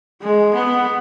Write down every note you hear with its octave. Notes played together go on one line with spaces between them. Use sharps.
G#3
B3